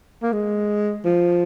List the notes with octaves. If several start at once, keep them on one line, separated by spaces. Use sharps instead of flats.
A#3
G#3
F3